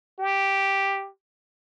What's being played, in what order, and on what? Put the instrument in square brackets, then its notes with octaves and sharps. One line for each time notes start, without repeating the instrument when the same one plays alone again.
[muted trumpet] G4